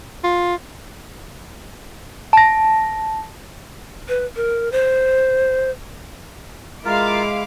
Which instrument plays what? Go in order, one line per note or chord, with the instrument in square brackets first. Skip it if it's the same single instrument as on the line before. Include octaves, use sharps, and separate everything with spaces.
[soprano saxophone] F4
[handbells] A5 A#6
[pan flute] B4
A#4
C5
[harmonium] G#3 [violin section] E4 F5 D6 [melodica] F4 A#4